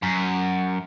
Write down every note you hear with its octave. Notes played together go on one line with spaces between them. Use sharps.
F#2